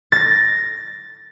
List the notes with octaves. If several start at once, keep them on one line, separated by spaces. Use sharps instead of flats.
A6 A#6